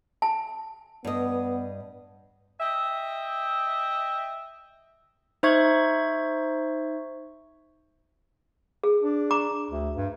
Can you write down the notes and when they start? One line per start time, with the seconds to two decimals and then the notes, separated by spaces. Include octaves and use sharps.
0.22 A5
1.05 G2 B3 D#5
2.60 D#5 E5 G5
5.43 D#4 C5 E5 C#6 G#6
8.84 G#4
9.03 D4
9.31 A#5 D6
9.71 D2
9.97 G2